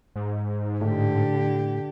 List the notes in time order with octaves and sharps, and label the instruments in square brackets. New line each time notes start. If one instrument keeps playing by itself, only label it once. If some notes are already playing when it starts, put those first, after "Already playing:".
[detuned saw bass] G#2
[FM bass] A2 [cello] D3 G4